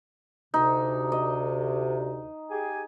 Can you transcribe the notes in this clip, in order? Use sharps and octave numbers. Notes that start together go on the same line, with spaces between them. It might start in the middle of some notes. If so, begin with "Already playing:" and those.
D2 C3 D#4
D#5
G4 G#4 G#5